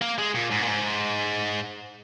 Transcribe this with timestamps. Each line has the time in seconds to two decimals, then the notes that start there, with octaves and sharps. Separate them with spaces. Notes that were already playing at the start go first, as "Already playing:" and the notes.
0.02 A#3
0.18 G#3
0.34 A#2
0.50 G#2
0.61 A#2
0.67 G#2